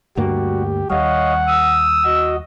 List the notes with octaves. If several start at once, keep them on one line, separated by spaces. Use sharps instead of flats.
D2 G2 G3 A#3 F#4 G4
D#2 G3 C#5 D#5 F5 F#5
D#6 E6
F#4 D#5